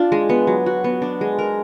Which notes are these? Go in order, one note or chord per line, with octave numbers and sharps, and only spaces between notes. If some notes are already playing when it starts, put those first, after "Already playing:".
Already playing: D4 F4
G#3
B3
F#3
F#4
B3
D4
G#3
A#4